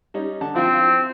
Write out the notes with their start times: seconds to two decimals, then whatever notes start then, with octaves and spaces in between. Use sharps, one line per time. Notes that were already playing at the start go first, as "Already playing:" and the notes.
0.14 G3 C#4 D#4
0.41 D3 A5
0.56 F3 C4 E4 F4